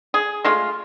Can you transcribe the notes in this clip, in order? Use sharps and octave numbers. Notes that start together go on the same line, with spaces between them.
G#4
G#3 A3 F4